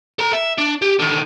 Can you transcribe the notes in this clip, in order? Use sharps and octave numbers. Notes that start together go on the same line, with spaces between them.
A4 A#5
E5
D4
G4
D3 D#3